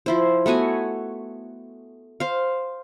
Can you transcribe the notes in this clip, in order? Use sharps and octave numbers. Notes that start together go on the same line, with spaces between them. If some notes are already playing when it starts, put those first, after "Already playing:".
F3 E4 C5
A3 B3 F#4 G#5
C5 F5